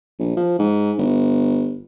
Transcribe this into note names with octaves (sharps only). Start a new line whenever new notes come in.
A#1
F3
G#2
G1